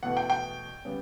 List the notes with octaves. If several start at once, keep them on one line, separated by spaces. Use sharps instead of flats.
E2 B2 A3 F#5
G5
G5
C#3 G3 B3